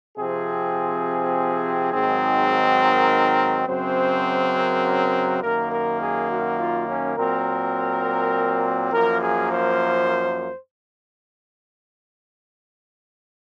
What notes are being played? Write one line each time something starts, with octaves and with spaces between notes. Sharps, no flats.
C3 F3 C4 G#4
G#2 D#3 F#3 C4
A#4
F#2 C#3 F#3 C4 C5
A#4
F#2 D#3 A#3 A#4
A#4
G#4
F#4
F4
C#4
A#2 F#3 C4 A#4
F#2 F3 A#3 A#4
G#4
C5